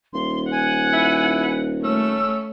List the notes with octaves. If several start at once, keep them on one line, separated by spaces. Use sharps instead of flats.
D#1 C6
F#5 G#5
E4
A3 C#4 E6